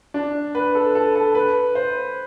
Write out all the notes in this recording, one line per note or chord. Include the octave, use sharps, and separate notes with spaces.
D4
B4
A4
A4
A4
B4
C5